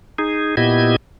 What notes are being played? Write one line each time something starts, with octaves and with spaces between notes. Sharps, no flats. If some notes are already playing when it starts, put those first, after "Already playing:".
D#4 G#4
A#2 B3 E4 G4 D#5 G#6